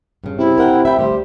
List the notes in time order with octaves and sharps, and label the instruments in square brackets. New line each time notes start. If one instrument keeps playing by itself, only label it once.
[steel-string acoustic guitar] G2 C#3
[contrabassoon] C3 [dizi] E4
[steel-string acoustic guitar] A#4 F#5 G5
[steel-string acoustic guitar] E5 G5 [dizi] B5
[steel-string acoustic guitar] D2 G3 C5 [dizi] G4